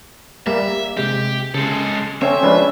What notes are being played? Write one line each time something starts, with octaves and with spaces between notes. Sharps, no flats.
G3 A#3 E5
C3 G#3 G4
C#3 G#3 A4
C4 C#4 A4 E5 G#5
F3 G#3 C#4 D4 B4